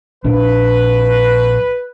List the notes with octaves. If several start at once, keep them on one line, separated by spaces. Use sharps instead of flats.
A#1 D4 B4